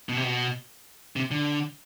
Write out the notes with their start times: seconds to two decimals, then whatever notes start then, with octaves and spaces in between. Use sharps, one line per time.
0.09 B2
0.17 C3
0.23 B2
1.16 C3
1.31 D3